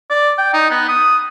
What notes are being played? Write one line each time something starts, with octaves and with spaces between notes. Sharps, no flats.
D5
G5
D#4
B3
D#6